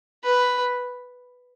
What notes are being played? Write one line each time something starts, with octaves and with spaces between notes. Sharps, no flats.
B4